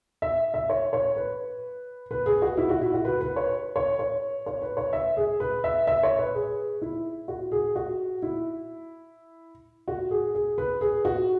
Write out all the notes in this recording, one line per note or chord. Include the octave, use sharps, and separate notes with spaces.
E5
E5
C#5
C#5
B4
B4
G#4
F#4
E4
F#4
E4
F#4
B4
B4
C#5
C#5
C#5
C#5
B4
C#5
E5
G#4
B4
E5
E5
C#5
B4
G#4
E4
F#4
G#4
F#4
E4
F#4
G#4
G#4
B4
G#4
F#4